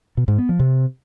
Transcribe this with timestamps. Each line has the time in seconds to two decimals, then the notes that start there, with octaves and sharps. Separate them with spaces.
0.17 B2
0.28 G#2
0.38 B3
0.49 F3
0.59 C3